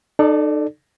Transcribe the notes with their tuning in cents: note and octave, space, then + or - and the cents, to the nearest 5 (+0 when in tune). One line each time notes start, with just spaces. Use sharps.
D#4 -35 A4 +0 D5 +0